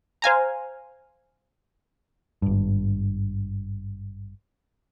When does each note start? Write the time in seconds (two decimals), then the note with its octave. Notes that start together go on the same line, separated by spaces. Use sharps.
0.22 C5 F5 G#5 A#5
2.42 G#1 G2